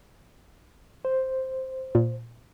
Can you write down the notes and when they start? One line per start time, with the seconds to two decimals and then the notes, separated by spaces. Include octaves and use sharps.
1.05 C5
1.95 A#2